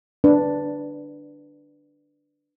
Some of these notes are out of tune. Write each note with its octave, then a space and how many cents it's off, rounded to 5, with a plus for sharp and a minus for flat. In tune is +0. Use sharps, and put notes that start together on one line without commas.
D4 +0 B4 +0